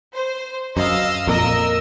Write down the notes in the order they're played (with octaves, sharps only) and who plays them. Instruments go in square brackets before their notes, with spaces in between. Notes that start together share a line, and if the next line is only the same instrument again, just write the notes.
[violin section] C5
[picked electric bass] F#2 [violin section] D#5 F5 E6
[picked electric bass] F2 A#2 [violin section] A#4 D#5 E6